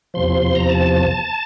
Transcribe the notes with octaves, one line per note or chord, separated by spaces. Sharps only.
E2 C3 F3 C6
C6
C6
A#5
A5